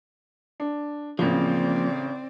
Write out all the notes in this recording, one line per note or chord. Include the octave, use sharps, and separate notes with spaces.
D4
A1 C#3 F3 A#3 C4 D5